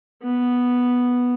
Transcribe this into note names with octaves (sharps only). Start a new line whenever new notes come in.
B3